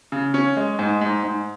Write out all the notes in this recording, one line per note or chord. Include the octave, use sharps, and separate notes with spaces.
C#3
C#4
G#3
G#2
G#2
G#2